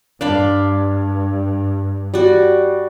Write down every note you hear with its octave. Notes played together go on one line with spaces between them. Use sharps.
G2 D4 F5 B5
G3 F#4